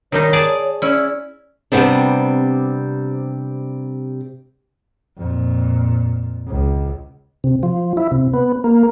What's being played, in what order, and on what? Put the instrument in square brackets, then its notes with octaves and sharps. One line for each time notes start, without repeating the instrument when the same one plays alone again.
[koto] D#3 G3 D#4 [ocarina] C#5
[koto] G#4 D5 A5
[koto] C#4 E4 [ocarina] D5
[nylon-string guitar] C3 E3 G3 B3 C4 D4
[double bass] F2 A#2
C#2
[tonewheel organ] C3
F3
E4
C3
B3
A#3